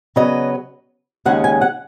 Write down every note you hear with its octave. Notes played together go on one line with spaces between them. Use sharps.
C#3 F#3 B3 D#5
D#2 C#3 G#3 C#4 F#5
G#5
F#5